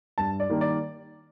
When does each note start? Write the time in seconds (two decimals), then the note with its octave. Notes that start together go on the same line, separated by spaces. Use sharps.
0.18 G2 A5
0.40 D5
0.50 D#3 G3 A#3
0.61 D5